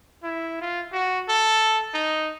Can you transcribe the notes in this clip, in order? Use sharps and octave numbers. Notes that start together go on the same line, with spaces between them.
E4
F4
F#4
A4
D#4